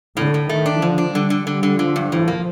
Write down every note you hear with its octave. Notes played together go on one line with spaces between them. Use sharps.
A2 D3
A2
D#3 A3
D4
D3 F3
D4
D3 G3
D3
D3 G3
D3
D3 F3
G2
A2 F3
A#3